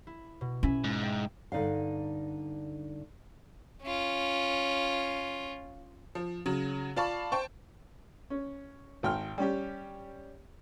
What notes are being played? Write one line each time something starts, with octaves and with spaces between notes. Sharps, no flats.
E4
B2
C#4 E4 E5 G#5
G#2
E5 G5
G2 D3 D#4 D5 F5
C#4 F4
F3
C#3 F#3
F4 D5 F5 A5 B5 C#6
C5 G5 A5 C#6
C#4
G#1 G5 F6
G3 C#4 G4